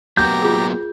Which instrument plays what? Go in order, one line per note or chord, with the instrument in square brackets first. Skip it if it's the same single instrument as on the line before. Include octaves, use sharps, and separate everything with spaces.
[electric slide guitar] F#3 A#3 B3 [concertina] G4 A#5 [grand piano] G6
[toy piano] F4 G#4 A#4